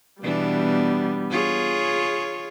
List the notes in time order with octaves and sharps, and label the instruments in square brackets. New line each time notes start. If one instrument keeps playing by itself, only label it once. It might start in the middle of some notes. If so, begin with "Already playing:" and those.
[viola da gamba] B2 E3 D4 [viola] G3 B3
[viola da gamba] F4 G#4 C#5